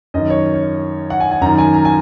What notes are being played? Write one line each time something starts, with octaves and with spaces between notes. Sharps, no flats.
F#2 D#3 D#5
C#5
C#5
F#5
G#5
G#5
F#2 D#3 A#5
G#5
A#5
G#5